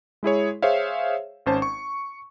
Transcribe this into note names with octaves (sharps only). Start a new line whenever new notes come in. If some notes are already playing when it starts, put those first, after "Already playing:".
G#3 E4 G#4 C#5
G#4 C5 C#5 E5 F5
G#1 C#4 C5 A5
C#6